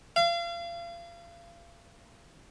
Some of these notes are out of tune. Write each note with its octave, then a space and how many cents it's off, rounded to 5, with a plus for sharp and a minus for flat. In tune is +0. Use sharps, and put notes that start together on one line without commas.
F5 -35